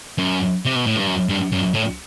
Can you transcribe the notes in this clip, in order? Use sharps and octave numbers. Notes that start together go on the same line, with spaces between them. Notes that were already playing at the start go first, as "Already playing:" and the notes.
F#2
C3
B2
A2
G2
F#2
G2
F#2
A2